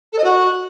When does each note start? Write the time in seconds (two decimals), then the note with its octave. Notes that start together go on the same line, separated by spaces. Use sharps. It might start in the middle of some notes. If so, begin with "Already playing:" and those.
0.12 A4
0.18 D#5
0.24 F#4